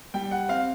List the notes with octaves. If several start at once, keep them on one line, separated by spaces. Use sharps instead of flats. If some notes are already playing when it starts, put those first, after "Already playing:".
G3 G5
F#5
C4 F5